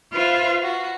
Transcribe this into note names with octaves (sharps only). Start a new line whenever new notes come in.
F4 B4 C5 E5
F#4